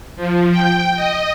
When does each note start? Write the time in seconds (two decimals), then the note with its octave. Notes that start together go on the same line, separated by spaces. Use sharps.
0.16 F3
0.52 G5
0.96 D#5